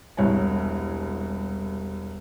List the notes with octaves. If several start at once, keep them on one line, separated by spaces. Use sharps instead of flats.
E1 C2 C#5 G#5